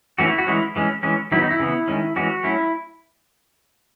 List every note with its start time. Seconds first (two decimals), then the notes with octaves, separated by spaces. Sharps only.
0.18 E3 A3 C#4 F#4
0.28 E4
0.38 F#4
0.47 E3 G#3 C#4 E4
0.76 E3 G#3 C#4
1.03 E3 G#3 C#4
1.32 D#3 F#3 B3 E4
1.41 D#4
1.51 E4
1.60 C#3 E3 B3
1.88 D#3 G#3 C#4
2.16 E3 G#3 C#4 F#4
2.43 F#3 A3 C#4 E4